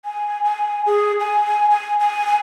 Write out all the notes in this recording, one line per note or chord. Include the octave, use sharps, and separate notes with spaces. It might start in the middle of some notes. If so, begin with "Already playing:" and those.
G#5
G#5
G#4
G#5
G#5
G#5